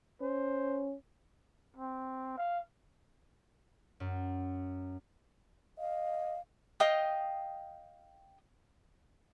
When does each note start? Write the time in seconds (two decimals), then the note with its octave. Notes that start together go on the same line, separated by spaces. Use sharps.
0.21 C#4 C5
1.76 C4
2.38 F5
4.00 F#2
5.78 D#5 F5
6.80 D#5 F5 G5 D#6